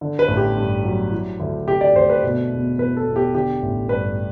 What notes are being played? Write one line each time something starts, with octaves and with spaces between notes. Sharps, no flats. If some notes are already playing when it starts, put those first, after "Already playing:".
D3
B4
A1
G4
G2
F#3
E3
D2
C3 G4
D5
D2 C5
B4
B2
E1
E2 B4
A4
E1
G4
D3 G4
A1
G2 B4